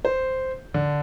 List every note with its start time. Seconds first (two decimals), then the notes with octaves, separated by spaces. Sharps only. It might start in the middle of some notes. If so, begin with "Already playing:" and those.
0.05 C5
0.74 D3